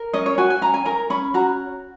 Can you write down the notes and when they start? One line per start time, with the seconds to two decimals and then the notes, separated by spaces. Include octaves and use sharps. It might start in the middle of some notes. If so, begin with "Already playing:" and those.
Already playing: A#4
0.13 C#4 D#5
0.26 C#5
0.38 F#4 G#5
0.50 G#5
0.62 C#4 A#5
0.74 G#5
0.85 A#4 A#5
1.10 C#4 B5
1.34 F#4 A#5